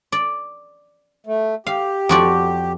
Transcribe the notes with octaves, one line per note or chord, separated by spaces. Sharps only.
D5
A3
G4 F5
F2 F#4 D5